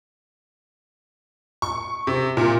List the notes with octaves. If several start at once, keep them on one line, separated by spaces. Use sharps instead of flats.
C#6
C3
A#2